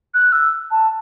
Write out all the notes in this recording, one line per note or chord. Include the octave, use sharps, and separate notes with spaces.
F#6
E6
A5